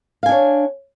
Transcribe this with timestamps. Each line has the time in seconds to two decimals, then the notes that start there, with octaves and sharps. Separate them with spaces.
0.23 F5
0.26 G#5
0.29 D4
0.32 C#5